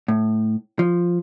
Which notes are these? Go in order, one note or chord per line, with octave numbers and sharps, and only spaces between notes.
A2
F3